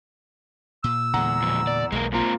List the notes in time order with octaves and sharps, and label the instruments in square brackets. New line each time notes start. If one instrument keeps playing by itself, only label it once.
[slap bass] A#2 [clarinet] E6
[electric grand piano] E2 F#5 A#5 [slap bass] A#2 D3 G#3
[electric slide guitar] F2 B2
D5
[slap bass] B1 [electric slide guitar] G#3 A#3 A#4
[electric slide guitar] G#2 C4 A#5 [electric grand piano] A#3 F4